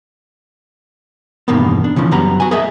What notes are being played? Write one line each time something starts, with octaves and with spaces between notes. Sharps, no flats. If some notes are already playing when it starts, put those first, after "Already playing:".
E2 G2 B2 D#3 A#3 B3
D4
C#3 E3 F3 C#4
F#2 G3 B3 A#5
F#4 G#5
G#4 A#4 D#5 E5